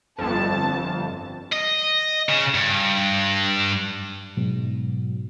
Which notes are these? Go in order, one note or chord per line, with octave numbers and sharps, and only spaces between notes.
G1 F2 A5
D#5
C#3
G2
G#2 B2 F#3